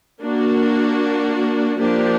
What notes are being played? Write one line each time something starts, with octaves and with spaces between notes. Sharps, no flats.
A#3 D4 F#4
F3 A#3 D4 G4